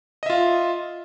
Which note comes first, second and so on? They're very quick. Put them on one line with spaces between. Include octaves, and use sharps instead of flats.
D#5 E5 F4